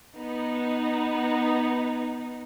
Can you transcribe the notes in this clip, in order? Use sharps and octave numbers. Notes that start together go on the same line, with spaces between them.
B3 D#4